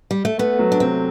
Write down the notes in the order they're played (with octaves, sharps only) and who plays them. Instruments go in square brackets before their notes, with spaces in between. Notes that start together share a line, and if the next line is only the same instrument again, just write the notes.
[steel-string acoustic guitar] G3
A3
[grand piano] A3 [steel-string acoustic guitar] B3
[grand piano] F#3
[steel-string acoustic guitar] D4
[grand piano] C3 [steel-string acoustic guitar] C4